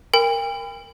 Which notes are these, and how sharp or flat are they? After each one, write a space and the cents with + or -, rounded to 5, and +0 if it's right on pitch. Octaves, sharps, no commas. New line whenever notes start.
A#4 +0 G5 +40 B5 +35